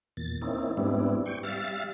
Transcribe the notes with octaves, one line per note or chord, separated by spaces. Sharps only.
E2 A#2 A6
A#3 C4 C#4 D#4 E4
G#2 G3 B3 C4 D4 E4
G5 C#6
G3 E5 F5 A6